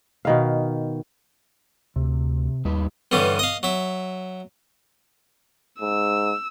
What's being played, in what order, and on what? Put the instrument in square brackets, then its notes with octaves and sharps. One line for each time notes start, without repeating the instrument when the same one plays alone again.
[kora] B2 D#3 F5
[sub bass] D2 [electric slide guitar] C3
[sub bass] D#2 [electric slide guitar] G3 D#4 B4
[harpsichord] G2 D3 E3 G3 C#4
D#5 F5
F#3 E5
[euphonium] G#2 [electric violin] E6